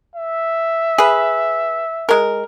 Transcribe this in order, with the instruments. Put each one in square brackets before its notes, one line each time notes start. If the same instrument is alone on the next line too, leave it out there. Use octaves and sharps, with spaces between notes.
[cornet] E5
[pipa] G#4 B4
G#3 A#4